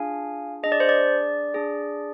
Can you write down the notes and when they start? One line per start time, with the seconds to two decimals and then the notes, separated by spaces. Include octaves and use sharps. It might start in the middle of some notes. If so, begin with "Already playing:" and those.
Already playing: D4 F4 G#4 F5 G#5
0.63 D4 G#4 D#5
0.72 D5
0.80 C5
0.89 D5
1.54 D4 G#4